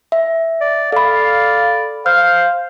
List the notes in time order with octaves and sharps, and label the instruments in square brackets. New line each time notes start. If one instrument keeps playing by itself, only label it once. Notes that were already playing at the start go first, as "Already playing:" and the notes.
[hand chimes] E5
[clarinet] D5
[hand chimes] A4 B5 [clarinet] D5 [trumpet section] F5
[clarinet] C5 [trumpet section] F5 [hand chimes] F6